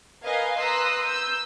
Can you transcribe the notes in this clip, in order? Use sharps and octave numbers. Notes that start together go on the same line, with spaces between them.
A#4 B4 D#5 F5 G#5 G#6
B4 A#5 C6 D#6 E6 F#6
E6 G6